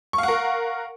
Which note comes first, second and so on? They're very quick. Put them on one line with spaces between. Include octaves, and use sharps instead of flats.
C#6 F5 F#5 A#4